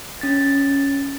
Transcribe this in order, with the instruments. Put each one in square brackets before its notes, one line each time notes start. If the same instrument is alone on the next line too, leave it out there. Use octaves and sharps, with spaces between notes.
[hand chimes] C#4 A6